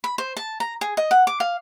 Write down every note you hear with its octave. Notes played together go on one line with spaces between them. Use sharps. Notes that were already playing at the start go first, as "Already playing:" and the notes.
B5
C5
A5
A#5
G#4
D#5
F#5
D6
F5